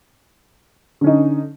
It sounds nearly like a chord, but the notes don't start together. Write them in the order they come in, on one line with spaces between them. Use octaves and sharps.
D3 C#4 D#4